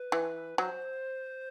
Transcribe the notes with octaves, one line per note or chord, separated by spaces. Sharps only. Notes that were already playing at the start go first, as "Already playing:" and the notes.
Already playing: B4
E3
F#3 C5